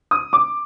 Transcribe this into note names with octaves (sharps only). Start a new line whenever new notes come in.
D#6
D6